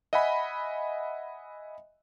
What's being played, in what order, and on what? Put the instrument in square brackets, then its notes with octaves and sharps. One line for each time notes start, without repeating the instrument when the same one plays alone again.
[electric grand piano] D#5 E5 F#5 G#5 B5